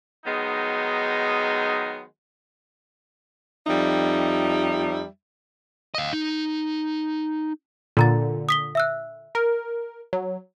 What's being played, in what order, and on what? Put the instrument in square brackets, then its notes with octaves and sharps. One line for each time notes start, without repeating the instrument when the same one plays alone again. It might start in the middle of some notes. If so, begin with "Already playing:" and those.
[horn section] D#3 F#3 G#3 B3 D#4
[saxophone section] F2 G3 D#4 E5
[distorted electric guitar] D#5 F5
D#4
[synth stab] A#2 D3 [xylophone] A4 A#5 A6
[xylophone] D#6 B6 G7
E5 E6 F#6
[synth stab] A#4
F#3